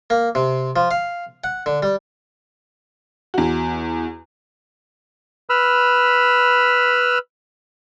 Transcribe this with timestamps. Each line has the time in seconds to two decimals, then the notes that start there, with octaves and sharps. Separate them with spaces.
0.10 A#3
0.35 C3
0.76 F3
0.91 F5
1.44 F#5
1.66 D3
1.83 G3
3.34 E2 F#4
5.50 B4 B5 E6 F6